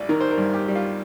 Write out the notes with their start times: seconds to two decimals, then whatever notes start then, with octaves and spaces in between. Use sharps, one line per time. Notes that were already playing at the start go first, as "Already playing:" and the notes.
Already playing: A1 G3 D5
0.09 D#3 A#4
0.21 C5
0.31 A#4
0.38 G2
0.54 G4
0.68 G3
0.75 F4